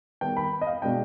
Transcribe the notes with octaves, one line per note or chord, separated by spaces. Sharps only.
D#3 G3 B3 G5
B5
D#5
F5
B2 G#3 D4 G5